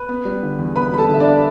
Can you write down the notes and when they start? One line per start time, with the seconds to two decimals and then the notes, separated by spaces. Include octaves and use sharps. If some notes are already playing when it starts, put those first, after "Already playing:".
Already playing: B4
0.09 B3
0.25 G3
0.43 D3
0.59 E2
0.76 B3 B4 B5
0.92 G3 B5
0.98 A4 A5
1.09 D3 E5
1.20 D4 D5